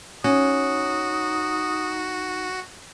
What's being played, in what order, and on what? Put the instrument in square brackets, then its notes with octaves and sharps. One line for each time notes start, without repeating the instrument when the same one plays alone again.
[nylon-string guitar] C#4 [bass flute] D#4 [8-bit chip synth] F#4 [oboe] D#6